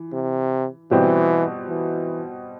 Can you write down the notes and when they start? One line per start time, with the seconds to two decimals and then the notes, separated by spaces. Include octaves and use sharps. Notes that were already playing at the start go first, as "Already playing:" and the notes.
Already playing: E3
0.13 C3
0.91 B2 E3 G3 C4 G4
1.68 E3